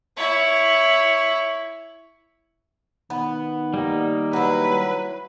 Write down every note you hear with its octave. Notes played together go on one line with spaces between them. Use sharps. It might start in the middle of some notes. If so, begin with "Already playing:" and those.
E4 C#5
D#3 B3
G3 A#3 D#4
F#3 E4 B4